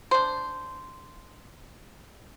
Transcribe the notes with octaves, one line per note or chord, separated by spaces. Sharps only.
D4 C5